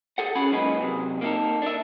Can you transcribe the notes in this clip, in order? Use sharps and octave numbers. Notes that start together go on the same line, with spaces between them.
G#4 A4 F#5
C#4 F#4 G#4 B5
G#2 F#3 A#3 G#4 B4 D#5
C3 F#3
A#3 B3 D#4 E4 A4 A#4
D4 E5